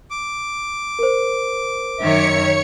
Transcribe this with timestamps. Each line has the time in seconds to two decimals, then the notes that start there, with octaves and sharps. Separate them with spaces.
0.11 D6
0.99 A#4 C5
2.00 F#2 D#3 C#5 E5 C#7